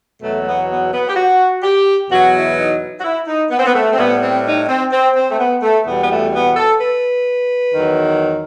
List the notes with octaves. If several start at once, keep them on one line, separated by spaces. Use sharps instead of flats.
E2 B2 F#3 A3
A3
B3
B3
B3
G4
F#4
G4
E2 B2 F#3 F#4
E4
D#4
F#4
E4
D#4
B3
C4
B3
A3
C4
A2 G3 B3
C4
D#4
C4
C4
C4
A3
B3
A3
E2 B2 G3 B3
B3
A3
B3
A4
B4
E2 D#3 F#3